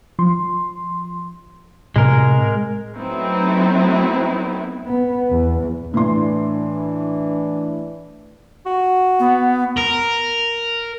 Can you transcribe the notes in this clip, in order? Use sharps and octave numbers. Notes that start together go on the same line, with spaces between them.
F3 C6
A2 C3 G#3 A#4
F#3 A3 B3 C4 D#4 E4
B3
E2
A2 E3 D4 C6
F#4
B3
A#4